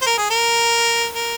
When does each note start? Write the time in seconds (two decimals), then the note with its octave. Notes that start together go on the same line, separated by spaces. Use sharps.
0.02 C5
0.06 A#4
0.18 G#4
0.30 A#4
1.15 A#4